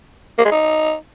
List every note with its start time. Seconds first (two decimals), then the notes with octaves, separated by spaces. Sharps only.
0.38 A#3
0.45 G#3
0.52 D#4